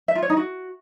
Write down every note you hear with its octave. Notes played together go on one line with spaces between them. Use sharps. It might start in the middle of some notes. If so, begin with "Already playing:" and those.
E5
F4
C#5
D#4
F#4